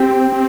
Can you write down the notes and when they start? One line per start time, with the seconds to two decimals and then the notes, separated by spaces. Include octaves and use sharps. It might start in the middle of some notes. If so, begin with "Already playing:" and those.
Already playing: C4 G4 G5
0.32 C4